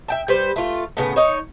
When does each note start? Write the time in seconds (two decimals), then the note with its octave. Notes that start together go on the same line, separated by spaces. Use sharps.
0.08 E5 G5 A5
0.28 G3 B4 C5
0.56 A3 F4
0.97 A2 C#3 B3
1.16 D#4 C#5